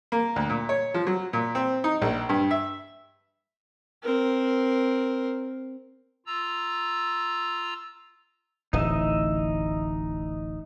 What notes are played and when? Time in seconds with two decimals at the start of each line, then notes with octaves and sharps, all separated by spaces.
0.12 A#3
0.36 D2
0.50 A#2
0.69 C#5
0.94 F3
1.07 F#3
1.33 A#2
1.55 C4
1.84 D#4
2.02 A#1
2.29 G2
2.51 E5
4.03 C4 A#4
6.26 F4 A#5 E6
8.73 D1 A1 D#4 D#5 E5